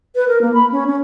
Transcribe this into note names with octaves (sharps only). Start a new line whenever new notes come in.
B4
A#4
A#3
B5
C#4
C#4